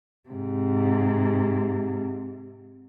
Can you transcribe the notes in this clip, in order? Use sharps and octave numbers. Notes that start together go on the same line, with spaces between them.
G#2 C3